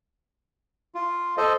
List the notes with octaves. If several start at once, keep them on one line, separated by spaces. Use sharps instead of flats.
F4
A4 C5 D#5